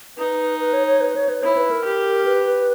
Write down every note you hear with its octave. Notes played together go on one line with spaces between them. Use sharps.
D#4 B4
B4
C#5
C#5
B4
C#5
B4
E4 C#5
B4
A#4
G4
B4